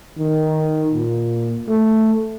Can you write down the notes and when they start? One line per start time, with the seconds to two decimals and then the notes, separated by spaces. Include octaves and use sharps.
0.19 D#3
0.93 A#2
1.68 A3